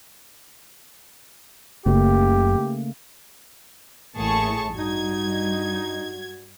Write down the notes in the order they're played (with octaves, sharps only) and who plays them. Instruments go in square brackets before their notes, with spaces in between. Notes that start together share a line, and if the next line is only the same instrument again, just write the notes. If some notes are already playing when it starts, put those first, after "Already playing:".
[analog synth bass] F#1 [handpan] C#3 A3 A#3 [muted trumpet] G4
[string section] A1 A2 [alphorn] A#3 [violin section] G#4 A5 C#6
[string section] G2 [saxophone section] D#4 [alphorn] F#4 [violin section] G#6